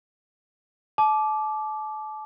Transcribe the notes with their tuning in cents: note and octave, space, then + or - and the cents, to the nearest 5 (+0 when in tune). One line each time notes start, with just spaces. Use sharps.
A5 -35 D6 +0